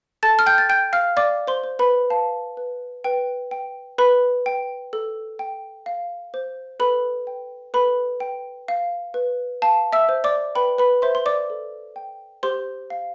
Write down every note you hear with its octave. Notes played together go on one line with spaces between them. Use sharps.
A4 A5 A6
F6
G5 G6
A6
G5 G6
F5 F6
D5 F5 D6
C5 C6
C5
B4 B5
F5 A5
B4
B4 G5
G5
B4 B5
G5
A4
G5
F5
C5
A4 B4 B5
G5
A4 B4 B5
G5
F5
B4
F5 A5
E5 E6
C5
D5 D6
B4 G5 B5
B4 B5
C5 E5 C6
C6
D5 D6
A4
G5
G4 C5 C6
F5